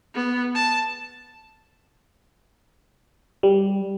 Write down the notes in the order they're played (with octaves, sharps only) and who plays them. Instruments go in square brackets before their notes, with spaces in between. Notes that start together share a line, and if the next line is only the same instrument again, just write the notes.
[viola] B3
A5
[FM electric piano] G3